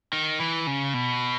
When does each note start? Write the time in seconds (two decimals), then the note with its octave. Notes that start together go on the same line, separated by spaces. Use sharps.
0.13 D#3
0.40 E3
0.67 C#3
0.94 B2